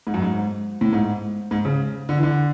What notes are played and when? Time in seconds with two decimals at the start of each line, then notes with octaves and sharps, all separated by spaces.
0.07 G#2
0.14 F#2
0.22 G#2
0.81 A2
0.93 G#2
1.51 G#2
1.65 C#3
2.09 D3
2.18 E3
2.23 D3